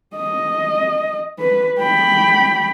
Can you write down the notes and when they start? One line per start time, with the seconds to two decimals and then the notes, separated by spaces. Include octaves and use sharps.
0.16 D#5
1.39 B4
1.79 G5 B5